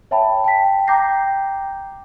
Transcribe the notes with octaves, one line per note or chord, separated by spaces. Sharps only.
C#5 E5 G5 A5 B5
G5 A5 B6
G5 A#5 D6 G6 A#6 C7